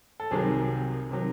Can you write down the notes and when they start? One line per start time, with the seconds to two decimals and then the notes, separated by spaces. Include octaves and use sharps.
0.20 A4
0.31 C2 C3 D#3 F#3 G#4
1.11 C3 D#3 F#3